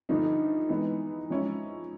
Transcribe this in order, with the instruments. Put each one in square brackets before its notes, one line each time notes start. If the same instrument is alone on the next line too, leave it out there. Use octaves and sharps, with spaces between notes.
[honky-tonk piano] G2 D3 F3 A3 D4 [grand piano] D#4
[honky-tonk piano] E3 G#3 B3
F3 G#3 C#4 E4